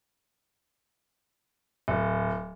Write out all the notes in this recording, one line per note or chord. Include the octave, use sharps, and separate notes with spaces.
D1